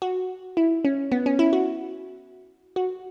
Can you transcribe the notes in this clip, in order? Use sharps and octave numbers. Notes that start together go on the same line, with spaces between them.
F#4
E4
C#4
B3
C#4
E4
F#4
F#4